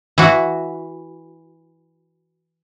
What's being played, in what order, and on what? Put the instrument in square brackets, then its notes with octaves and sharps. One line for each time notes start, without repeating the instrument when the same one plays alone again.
[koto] E3 F#4